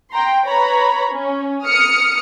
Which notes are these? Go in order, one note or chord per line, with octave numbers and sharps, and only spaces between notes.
G5 A#5 C6
B4 C#5 A#5 B5
C#4
D#6 F6 C#7